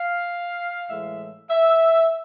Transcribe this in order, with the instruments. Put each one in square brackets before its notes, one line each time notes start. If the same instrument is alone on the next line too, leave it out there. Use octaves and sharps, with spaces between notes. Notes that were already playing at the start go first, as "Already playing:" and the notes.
Already playing: [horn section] F5
A2 E3 G#3 E5
E5